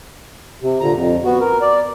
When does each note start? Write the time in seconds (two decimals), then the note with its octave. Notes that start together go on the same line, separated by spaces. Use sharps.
0.62 C3
0.80 A#2 D3 A#5
0.93 F2
1.25 B3 F#4
1.41 A#4
1.62 D5